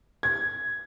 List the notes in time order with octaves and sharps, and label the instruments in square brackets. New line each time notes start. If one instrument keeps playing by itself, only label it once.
[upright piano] G#6